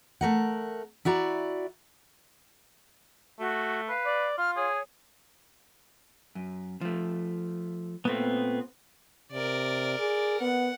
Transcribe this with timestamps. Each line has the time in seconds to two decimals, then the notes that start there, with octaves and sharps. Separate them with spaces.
0.21 A3 A#4 F#5
1.05 E4 F#4 D5 A#5
3.40 A3 F#4
3.89 B4 F5
4.06 D5
4.38 F4 F6
4.57 G#4 C#5
6.35 F#2
6.81 F3 A3
8.05 A#2 A3 B3 C4
9.32 C3 A#4 D5
9.99 G#4
10.41 B3 F#5